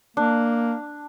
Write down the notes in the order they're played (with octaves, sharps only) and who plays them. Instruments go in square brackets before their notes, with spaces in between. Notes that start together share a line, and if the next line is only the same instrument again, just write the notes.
[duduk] A#3 [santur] D4